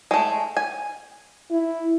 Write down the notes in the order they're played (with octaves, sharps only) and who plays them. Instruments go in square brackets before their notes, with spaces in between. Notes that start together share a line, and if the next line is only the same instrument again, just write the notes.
[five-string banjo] G#3 A3
G#5
[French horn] E4